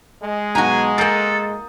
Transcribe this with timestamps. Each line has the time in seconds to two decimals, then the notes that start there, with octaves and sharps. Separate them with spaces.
0.23 G#3
0.55 B1 B2 D#4 F#4 G#5 A#5
0.98 A#3 A4 A#4 D#6 G6 A6